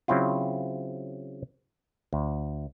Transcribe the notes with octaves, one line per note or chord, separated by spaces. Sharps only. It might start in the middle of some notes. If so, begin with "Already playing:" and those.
C#3 F#3 C4 E4 F4
D2